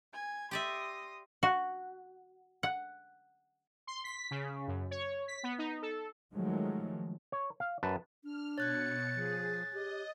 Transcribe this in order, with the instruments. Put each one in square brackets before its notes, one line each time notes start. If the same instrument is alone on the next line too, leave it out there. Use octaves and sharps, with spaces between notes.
[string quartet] G#5 G#6
[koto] G4 D5 E5 [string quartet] C6 D#6 A#6
[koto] F#4
F#5
[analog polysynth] C6
B6
C#3
F#2
C#5
B6
B3
D#4
A4
[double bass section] D#3 F3 F#3 G#3 A3
[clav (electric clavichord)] C#5
F5
F#2 B4 A5
[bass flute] D4 [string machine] F6
[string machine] B2 C#7 [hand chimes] C#5 F#6 G#6 [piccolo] A6
[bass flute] F3 [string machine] G#4
[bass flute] G4 [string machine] D#5